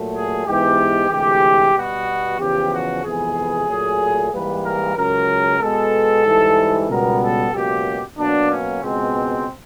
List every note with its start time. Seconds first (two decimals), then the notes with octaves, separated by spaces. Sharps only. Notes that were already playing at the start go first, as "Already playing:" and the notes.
Already playing: A#2 F#3 A3
0.13 G#4
0.45 G#2 E3 G#3 B3 G4
1.10 D2 C3 E3 G#3 G4
1.74 B2 G3 B3 F#4
2.39 E2 C#3 F3 G4
2.72 F#4
3.03 F2 C3 E3 G#3 B3 G#4
3.67 A#2 F#3 A3
4.32 G#2 E3 G3 A#3 B4
4.64 A#4
4.96 C#2 C#3 F#3 A#4
5.60 B2 G#3 B3 A4
6.25 G#2 E3 G3
6.89 C#2 B2 G3 B3 A#4
7.21 A4
7.53 C#2 B2 F#3 A#3 G4
8.17 B2 F#3 A#3 D4
8.50 C#4
8.81 C#2 B2 G#3 B3 C4